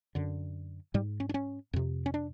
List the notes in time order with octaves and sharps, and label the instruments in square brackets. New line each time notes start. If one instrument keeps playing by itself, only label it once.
[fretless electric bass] F#2 D3
G#2 G3
C#4
D4
C#4
F2 C3
C#4
D4